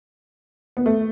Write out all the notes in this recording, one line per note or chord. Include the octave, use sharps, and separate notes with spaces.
B3
A3